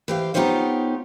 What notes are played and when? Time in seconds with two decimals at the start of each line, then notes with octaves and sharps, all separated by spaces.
0.08 E3 G4 C5 F5
0.34 B3 D#4 F4 G4 C5 C#5